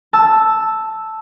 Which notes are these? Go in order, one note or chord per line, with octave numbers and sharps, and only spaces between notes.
A5 E6